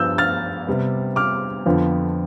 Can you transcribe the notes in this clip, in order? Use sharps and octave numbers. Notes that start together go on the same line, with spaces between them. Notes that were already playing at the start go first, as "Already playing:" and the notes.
Already playing: G2 F3 B3 E6 G6
F6 A6
C3 G3 B3
D6 F6
F2 D3 F3 B3